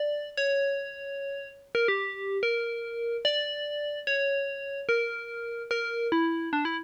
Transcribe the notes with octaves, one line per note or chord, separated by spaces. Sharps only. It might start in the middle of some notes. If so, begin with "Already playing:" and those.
Already playing: D5
C#5
A#4
G4
A#4
D5
C#5
A#4
A#4
E4
D4
E4